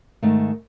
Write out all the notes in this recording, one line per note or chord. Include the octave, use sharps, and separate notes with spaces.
G#2 D#3 A3